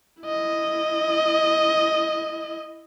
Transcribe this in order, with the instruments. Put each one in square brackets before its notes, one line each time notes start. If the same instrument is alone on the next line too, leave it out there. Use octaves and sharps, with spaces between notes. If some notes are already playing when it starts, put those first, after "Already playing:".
[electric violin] E4 D#5